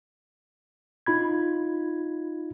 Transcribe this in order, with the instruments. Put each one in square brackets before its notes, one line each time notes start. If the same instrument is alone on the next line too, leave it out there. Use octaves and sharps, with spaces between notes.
[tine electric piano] D#4 F4 B5 G#6